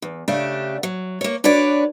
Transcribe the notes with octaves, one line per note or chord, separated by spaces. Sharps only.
E2
C#3 A3 D4 G4
F#3
A#3 C#5
D4 F#4 B4 C#5 D5